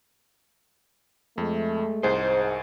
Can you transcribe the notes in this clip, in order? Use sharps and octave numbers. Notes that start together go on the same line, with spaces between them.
F2 G#3 A3
C2 G#2 G#4 C5